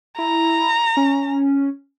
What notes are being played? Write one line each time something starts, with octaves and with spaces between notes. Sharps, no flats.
E4 A#5
C#4